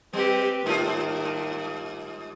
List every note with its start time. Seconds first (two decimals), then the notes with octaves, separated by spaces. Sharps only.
0.13 G3 C4 G4 B4
0.66 G#2 D#3 G3 F4